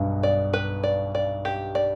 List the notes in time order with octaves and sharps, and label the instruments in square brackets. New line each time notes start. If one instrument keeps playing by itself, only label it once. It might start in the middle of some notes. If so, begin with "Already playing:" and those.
Already playing: [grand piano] B1 G2 B2
[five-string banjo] D5
B4
D5
D5
G4
D5